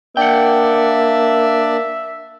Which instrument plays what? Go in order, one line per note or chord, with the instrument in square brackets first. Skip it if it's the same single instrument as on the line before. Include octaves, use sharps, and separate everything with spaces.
[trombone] A#3 [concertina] D4 D5 [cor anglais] E5 [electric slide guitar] F#5 G5